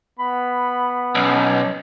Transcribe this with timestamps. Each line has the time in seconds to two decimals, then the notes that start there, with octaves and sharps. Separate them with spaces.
0.19 B3 B5
1.15 B1 C#4